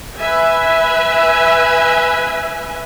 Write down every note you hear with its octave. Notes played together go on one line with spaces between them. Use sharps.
B4 E5 G#5